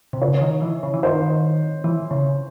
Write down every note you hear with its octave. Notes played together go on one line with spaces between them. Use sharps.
C3
C#3 C#5
D#3
E3
C#3
E3
D#3 C5
E3
C#3